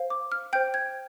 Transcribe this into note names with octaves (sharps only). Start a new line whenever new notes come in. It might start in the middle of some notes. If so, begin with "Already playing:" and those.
Already playing: C5 F5
D6
F6
C5 G5 G6
G#6